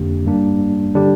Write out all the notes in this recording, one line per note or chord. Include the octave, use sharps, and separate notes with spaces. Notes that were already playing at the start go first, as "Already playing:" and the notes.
Already playing: F2 D3 A#3 D4 G4
G2 G3 A#3 D4
D3 G3 D4 G4